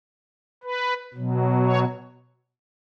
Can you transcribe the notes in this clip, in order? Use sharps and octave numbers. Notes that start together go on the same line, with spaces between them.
B4
B2 F#3
C#5